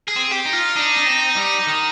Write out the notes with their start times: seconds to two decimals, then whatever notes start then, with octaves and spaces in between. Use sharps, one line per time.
0.08 G#4
0.16 C4
0.32 G4
0.46 D#4
0.53 F4
0.76 D4 D#4
0.97 D4
1.06 C4
1.36 G3
1.67 D#3